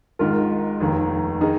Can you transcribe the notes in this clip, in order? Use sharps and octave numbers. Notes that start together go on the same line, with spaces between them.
G#1 G#2 D#3 F4 A#4
F1 D#2 D#3
D#3 D#4 G#4